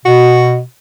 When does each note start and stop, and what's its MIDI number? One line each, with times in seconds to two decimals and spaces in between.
0.05 0.61 47
0.05 0.61 66